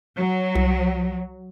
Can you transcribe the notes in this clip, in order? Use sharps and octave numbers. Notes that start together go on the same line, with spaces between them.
F#3
C2